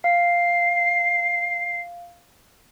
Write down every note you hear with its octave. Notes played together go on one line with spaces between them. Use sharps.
F5 C7